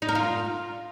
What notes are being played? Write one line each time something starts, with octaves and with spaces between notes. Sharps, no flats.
D#4
A#4
F4